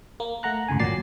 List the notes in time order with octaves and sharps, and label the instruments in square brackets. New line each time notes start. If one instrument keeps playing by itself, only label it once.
[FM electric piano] A#3
A3 F#5 A#5 F#6
G#1 C#2 A2 C#3 G#5
G#1 A#2 F#3 D5 A6 C7